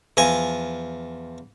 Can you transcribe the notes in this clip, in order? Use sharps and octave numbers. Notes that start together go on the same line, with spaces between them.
E2 F3 G#5 A#5